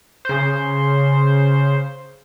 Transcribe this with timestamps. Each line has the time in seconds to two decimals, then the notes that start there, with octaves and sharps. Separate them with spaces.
0.25 C#3 C5